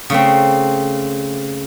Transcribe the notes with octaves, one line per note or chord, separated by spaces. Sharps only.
C#3 A3 C4